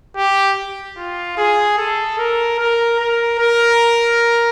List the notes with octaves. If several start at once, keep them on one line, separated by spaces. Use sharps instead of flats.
G4
F4
G#4
A4
A#4
A#4
A#4
A#4